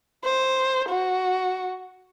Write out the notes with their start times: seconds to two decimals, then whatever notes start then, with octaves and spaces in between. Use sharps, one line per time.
0.24 C5
0.88 F#4